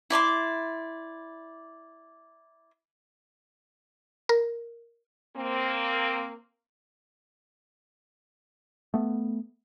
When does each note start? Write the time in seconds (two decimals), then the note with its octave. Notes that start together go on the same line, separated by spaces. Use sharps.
0.10 E4 D5 C6 D6
4.29 A#4
5.37 A#3 C4
8.94 A3 B3